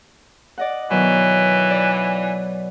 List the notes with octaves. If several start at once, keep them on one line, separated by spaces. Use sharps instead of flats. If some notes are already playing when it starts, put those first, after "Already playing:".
D5 D#5 F#5
B2 D#3 E3 F#3
D5